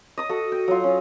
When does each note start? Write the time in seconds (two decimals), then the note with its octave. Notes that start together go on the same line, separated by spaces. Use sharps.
0.18 D#5 D#6
0.29 F#4 A4
0.52 G5
0.68 F#3 F4
0.84 C#4